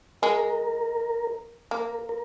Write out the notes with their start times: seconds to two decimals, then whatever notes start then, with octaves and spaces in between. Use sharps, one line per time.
0.22 G#3 A#4
1.71 A#3 A#4
2.09 A#4